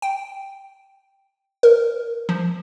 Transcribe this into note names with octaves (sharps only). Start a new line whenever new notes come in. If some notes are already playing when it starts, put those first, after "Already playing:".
G5
A#4
F3